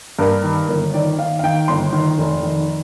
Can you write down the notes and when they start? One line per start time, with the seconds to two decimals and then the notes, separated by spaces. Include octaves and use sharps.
0.19 G2 A#4
0.43 D#3
0.69 G1 A#4
0.94 D#3 D5
1.18 D#3 F5
1.39 F5
1.44 D#3 G5
1.68 G1 C6
1.93 D#3
2.18 F1
2.43 D#3